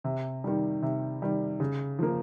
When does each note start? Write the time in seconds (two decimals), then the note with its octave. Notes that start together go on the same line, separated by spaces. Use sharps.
0.04 C3
0.44 D#3 G3
0.82 C3
1.22 D#3 G3
1.60 C#3
1.99 F3 A#3